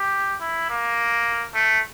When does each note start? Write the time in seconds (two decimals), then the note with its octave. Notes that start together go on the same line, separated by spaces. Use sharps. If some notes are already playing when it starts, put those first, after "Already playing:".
Already playing: G4
0.41 E4
0.70 A#3
1.55 A3